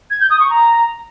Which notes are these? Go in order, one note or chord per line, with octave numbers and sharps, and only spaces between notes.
G#6
G6
D#6
C#6
A#5